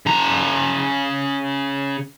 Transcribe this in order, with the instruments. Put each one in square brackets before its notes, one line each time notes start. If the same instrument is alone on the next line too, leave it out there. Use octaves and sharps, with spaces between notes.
[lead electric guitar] C#3 A#5